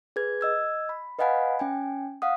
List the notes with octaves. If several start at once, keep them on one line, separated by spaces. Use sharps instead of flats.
G#4 B4 G#6
D#5 E6 G#6
B5
B4 D#5 F5 F#5 G#5 B5
C#4 G5 G#5
F5 F#5 D#6